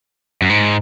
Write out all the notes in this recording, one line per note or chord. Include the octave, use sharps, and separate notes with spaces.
F#2
G#2